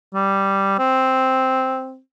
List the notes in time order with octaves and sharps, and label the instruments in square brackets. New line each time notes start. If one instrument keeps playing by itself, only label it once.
[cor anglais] G3
C4